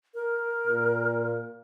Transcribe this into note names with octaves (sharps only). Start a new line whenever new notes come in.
A#4
A#2